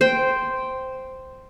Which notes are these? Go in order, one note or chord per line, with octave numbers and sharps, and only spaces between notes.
C5 G5